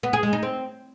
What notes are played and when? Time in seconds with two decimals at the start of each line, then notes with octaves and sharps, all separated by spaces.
0.03 B3
0.13 G#4
0.23 G#3
0.33 D#4
0.43 C4